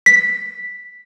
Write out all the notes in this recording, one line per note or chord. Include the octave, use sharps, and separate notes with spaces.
B6